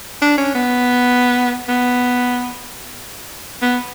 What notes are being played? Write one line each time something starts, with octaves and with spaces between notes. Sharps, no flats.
D4
C#4
B3
B3
B3